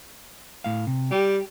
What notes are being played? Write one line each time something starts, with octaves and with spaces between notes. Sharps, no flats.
A2 F5
C3
G3 G4